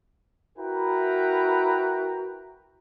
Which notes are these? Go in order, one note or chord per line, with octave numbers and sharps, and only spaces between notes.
E4 F#4 A#4 B4 G5 A#5